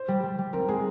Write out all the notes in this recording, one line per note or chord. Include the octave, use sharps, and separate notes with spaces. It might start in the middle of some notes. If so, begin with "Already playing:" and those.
Already playing: C5
G3
G3
G3
C4 A#4
G#3 G#4